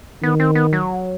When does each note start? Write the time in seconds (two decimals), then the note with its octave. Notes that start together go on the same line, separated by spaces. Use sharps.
0.22 D#3 B3
0.40 C4
0.55 B3
0.73 F#3